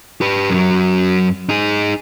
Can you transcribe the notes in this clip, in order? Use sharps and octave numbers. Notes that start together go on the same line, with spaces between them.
G4 B4
F#2 F#3
D#4 G#4